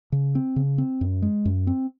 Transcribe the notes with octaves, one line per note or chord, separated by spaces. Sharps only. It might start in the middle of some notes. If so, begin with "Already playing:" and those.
C#3
C4
C#3
C4
F#2
G#3
F#2
C4